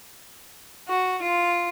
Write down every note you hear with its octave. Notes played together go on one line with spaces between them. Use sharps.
F#4
F4